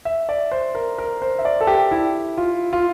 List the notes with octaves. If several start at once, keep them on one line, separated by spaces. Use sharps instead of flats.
E5
D5
C5
A#4
A#4
C5
E5
D5
A4
G4
E4
F4
F4